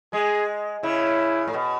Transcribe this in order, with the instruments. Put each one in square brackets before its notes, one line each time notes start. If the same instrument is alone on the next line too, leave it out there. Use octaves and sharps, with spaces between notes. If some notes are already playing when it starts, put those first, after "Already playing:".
[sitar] G#3 [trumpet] G#4
[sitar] C#3 [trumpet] E4
[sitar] A2
B2